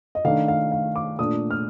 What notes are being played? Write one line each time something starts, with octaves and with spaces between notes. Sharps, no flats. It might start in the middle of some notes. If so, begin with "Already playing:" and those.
D#5
D#3 A3 D4 F5
F5
F5
D6
A#2 A3 D4 D#6
F6